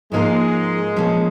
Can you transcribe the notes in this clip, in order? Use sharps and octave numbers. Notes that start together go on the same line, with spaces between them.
G#2 F3 G#3 A#3 F4 A#4
A#2 F3 A#3 C#4